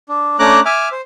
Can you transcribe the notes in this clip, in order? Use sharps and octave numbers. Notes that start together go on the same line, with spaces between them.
D4
A3 C#4 D4 A#5 D6 F#6
E5 G#5 D6 F6
C5